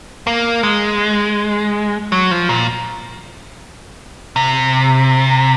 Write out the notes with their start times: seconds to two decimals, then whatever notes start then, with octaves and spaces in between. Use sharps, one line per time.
0.27 A#3
0.63 G#3
2.12 F#3
2.31 F3
2.49 A#2
4.36 C3